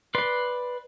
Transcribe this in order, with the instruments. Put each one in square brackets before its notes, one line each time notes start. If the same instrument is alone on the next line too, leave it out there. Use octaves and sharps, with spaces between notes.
[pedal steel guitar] B4 D5 C6